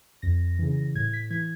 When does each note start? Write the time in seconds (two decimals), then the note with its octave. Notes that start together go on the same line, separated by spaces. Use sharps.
0.22 F2 A#6
0.59 C#3 E3
0.95 A2 G#6
1.13 B6
1.31 E3 G#6